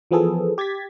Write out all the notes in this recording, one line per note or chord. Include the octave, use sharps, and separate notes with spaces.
E3 F3 B3 G#4 A4
G4 G#6 A6 B6